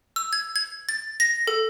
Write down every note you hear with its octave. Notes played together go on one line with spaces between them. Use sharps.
E6
G#6
G#6
A6
A#6
A4